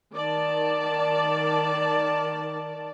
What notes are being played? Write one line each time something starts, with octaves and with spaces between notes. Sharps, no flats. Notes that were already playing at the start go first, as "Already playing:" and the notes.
D#3 D5 A5